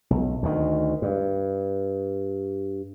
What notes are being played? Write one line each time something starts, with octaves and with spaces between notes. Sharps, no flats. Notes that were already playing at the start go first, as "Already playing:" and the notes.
B1
D2 D#3
G2